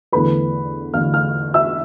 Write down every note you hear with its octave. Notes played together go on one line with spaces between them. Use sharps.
E2 D3 A3 B4 B5
E2 D3 A3 F5 F6
F5 F6
E5 E6